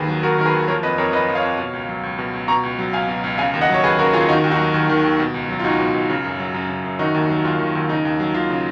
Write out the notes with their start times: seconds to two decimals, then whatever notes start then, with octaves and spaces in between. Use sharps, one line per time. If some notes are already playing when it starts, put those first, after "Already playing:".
Already playing: D#2 D#3 G#4 B4
0.08 F#3
0.23 D#2 F#4 A#4
0.38 D#3 A#4
0.45 G#4 B4
0.54 D#2
0.68 F3 A#4 C#5
0.83 F2 B4 D#5
0.98 F2 A#4 C#5
1.13 F3 B4 D#5
1.28 F3
1.35 C#5 F5
1.43 F2
1.58 B2
1.73 C#2
1.89 F#3
2.03 C#2
2.19 B2
2.33 C#2
2.48 B2 A#5 C#6
2.63 C#2
2.79 F#3
2.93 C#2 F5 G#5
3.08 B2
3.24 C#2
3.38 C#3 F5 G#5
3.54 D#2
3.61 D#5 F#5
3.69 F#3 C#5
3.83 D#2 G#4 B4
3.98 C#3 F#4 A#4
4.13 D#2 F4 G#4
4.28 D#3 D#4 F#4
4.44 D#2
4.51 D#4 F#4
4.59 F#3
4.74 D#2
4.89 D#3
5.04 D#2
5.19 B2
5.34 C#2
5.49 F#3
5.60 F4
5.64 C#2 D#4 F#4
5.79 B2
5.94 C#2
6.10 C#3
6.24 F#2
6.39 F#3
6.54 F#2
6.69 C#3
6.84 F#2
6.99 D#3 D#4 F#4
7.14 D#2
7.29 F#3
7.45 D#2 F4
7.59 D#3
7.75 D#2
7.89 C#3 D#4
8.05 D#2
8.20 F#3
8.34 D#2 F4
8.50 C#3